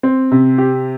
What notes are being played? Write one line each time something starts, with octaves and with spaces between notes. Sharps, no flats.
C4
C3
G4